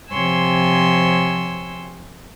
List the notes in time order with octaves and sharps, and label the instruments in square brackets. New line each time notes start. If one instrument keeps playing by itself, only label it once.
[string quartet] C3 F3 C#5 G#5 C6 E6